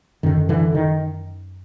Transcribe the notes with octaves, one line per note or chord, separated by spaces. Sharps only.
F#2 D3 D#3
D3 E3
D#3